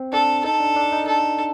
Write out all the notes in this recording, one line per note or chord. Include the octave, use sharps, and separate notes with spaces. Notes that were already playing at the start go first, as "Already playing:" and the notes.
Already playing: C4
D4 A4
D#4 A4
D4
D4
D#4
A4